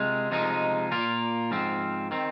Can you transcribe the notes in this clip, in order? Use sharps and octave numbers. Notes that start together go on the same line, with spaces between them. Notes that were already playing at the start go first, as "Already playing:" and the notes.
Already playing: C3 G#3 F4
C3 F3 G#3 D#4
A#2 A#3 F4
G#2 F3 C4
D#3 C4